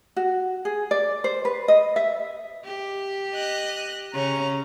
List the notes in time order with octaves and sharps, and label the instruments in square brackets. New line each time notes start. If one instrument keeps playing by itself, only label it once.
[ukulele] F#4
G#4
D5
C5
B4
D#5
E5
[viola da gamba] G4
[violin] D#5 F#6
[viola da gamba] C#3 C#4 [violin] A#5